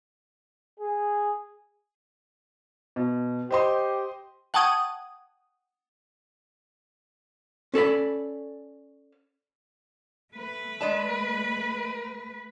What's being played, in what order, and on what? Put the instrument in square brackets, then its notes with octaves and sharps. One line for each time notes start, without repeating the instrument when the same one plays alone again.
[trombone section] G#4
[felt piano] B2
[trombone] G4 [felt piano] C5 D#5 C6
[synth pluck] F#5 G5 A5 C#6 D#6 G#6
[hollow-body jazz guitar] C#4 A4 D5 B5
[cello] A3 B4
[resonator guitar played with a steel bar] G#3 D5 A5